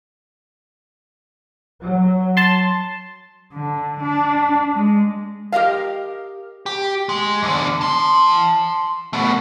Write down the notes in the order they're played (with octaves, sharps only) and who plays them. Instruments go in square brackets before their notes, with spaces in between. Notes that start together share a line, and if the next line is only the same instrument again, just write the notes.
[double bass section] F#3
[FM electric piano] A5 C6
[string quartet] D3
D4
G#3
[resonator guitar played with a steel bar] G4 A#4 D#5 F5
[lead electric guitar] G4
G#3
E2 D3
A5 C6
A3 B3